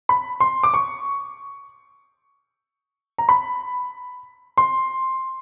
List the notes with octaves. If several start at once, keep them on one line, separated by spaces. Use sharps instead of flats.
B5
C6
D6
C#6
A#5
B5
C6